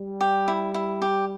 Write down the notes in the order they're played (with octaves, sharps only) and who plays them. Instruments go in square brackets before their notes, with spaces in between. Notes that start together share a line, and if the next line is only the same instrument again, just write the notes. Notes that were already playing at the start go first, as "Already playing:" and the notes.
Already playing: [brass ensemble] G3
[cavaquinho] G4
E4
E4
G4